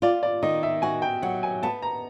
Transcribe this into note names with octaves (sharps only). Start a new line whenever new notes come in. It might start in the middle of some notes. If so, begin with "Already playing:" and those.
F4 D5
D5
D#3 D#5
E5
F#4 G#5
G5
F#3 F#5
G#5
B3 A5
A#5